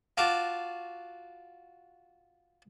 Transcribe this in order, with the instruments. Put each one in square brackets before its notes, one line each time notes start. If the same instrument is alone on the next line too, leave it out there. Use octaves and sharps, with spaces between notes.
[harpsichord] F4 F#4 A5 D6